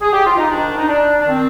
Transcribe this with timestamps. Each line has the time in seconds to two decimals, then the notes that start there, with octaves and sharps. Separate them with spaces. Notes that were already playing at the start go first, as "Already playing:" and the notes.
0.01 G#4
0.13 G4
0.25 F4
0.37 D#4
0.49 G#2 D#3 D4
0.78 D#4
0.88 D4
1.20 D4
1.27 D#3 C4